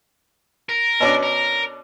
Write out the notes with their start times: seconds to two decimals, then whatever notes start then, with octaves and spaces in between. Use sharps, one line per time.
0.69 A#4
1.00 B2 C#4 D4
1.23 A#4